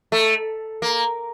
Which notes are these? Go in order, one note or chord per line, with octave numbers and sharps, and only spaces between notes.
A3
A#3